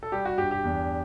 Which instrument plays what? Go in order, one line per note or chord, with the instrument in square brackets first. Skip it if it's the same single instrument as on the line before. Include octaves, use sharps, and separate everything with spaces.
[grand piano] A4
G3 G4
F#4
G2 G4
G4
E2